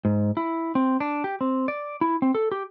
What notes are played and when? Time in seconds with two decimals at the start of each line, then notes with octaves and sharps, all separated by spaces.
0.05 G#2
0.37 E4
0.75 C4
1.00 D4
1.24 G4
1.41 C4
1.68 D5
2.01 E4
2.22 C4
2.35 A4
2.52 G4